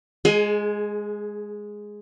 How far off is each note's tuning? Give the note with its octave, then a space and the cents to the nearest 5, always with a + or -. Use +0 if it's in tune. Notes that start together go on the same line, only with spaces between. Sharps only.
G#3 +0 G#4 +30